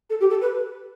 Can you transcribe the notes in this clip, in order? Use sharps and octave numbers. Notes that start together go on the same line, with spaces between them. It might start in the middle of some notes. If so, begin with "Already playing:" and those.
A4
G4
A4
B4